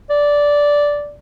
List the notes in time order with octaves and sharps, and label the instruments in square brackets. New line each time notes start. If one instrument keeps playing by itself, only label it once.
[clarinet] D5